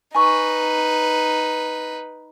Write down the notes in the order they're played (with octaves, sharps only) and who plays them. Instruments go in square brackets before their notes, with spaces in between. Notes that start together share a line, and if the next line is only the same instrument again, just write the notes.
[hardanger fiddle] D#4 B4 [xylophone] G#5 C#6